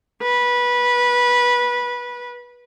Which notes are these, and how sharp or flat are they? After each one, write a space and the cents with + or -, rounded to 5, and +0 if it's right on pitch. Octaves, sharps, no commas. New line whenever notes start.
B4 -20